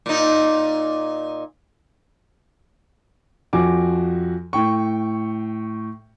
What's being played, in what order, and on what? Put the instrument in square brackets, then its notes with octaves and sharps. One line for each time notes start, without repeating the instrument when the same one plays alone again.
[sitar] A#2 D#4
[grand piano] F2 F3 F#4 G#5 D6
A2 G5 C#6